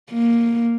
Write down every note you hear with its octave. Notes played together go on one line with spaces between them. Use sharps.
A#3